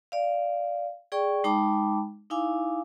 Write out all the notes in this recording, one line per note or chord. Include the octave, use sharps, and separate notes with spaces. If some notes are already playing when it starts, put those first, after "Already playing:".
D5 F5
G#4 D5 G5 C#6
G#3 D#4 G5 A5 B5 D6
D#4 E4 F5 G#5 D6